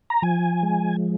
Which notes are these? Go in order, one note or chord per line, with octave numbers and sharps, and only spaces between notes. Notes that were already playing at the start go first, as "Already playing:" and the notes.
A#5
F3 G#5
G#3